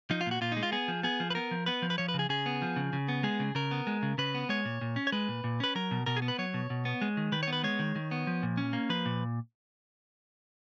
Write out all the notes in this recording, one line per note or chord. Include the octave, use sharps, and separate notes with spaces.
F3 D#4
F4
A#2 F#4
A#2 F4
G#3 D#4
F4
B3 G#4
F3
B3 G#4
F3
B4
B3 A#4
F3
B3 B4
F3
B4
F3 C#5
B4
C#3
G#4
C#3 G#4
B3
F3
C#3
C#3
B3
G#3 G#4
C#3
C#3 A#4
B3
G#3
C#3
C#3 B4
B3
G#3 C#5
A#2
A#2
C#4
C#5
G#3 B4
A#2
A#2
C#4 B4
F#3 A#4
B2
B2 A#4
G#4
B3
B4
F#3 C#5
B2
B2
B3
G#3
D#3
D#3 B4
C#5
B3
B4
G#3 C#5
D#3
D#3
B3
F3
A#2
C#4
A#3
F3 B4
A#2